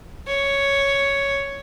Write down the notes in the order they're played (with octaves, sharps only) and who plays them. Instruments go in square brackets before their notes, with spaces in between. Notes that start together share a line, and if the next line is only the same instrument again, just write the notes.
[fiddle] C#5